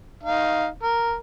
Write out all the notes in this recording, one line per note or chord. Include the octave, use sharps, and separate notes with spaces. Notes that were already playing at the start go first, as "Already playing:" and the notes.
D#4 F5
A#4